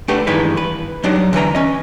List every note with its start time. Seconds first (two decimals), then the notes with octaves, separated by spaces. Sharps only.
0.08 A3 D4 G4 A4 B4 F#5
0.27 G2 D#3 E3 G#3 B4
0.57 B4
1.03 F#3 G3 D4 D#4 D5
1.33 D2 E3 B4 A#5
1.55 C#4 D#5